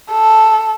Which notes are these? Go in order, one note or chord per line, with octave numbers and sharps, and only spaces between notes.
A4